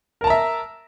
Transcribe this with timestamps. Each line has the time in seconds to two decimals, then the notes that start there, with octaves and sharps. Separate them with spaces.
0.21 A#4
0.24 A5
0.27 A#5
0.30 E5